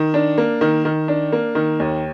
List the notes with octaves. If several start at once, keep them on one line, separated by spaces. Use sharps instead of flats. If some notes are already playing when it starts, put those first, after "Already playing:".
Already playing: D#3
D4
A#3
D#3
D#3
D4
A#3
D#3
D#2